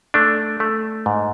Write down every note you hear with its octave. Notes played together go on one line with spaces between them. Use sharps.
A3 D4
A3
G#2